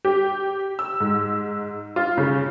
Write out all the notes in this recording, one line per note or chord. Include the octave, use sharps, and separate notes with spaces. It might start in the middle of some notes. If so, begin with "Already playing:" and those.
G4
E6
G#2
F4
C#3